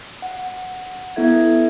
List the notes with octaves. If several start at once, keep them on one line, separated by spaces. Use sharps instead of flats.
F#5
B3 E4 A4 E5 G#6